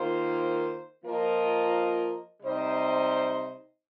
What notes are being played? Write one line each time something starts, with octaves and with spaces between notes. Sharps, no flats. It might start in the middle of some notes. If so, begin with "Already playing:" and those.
Already playing: D#3 A#3 F4 C5
F3 A#3 F4 A#4 D#5
C3 G3 D#4 C5 D#5